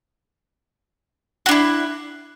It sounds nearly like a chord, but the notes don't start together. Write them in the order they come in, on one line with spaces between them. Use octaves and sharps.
F#4 D4 E4